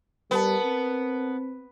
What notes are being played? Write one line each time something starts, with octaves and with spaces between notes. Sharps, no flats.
G3 B3 A#4 A5
C4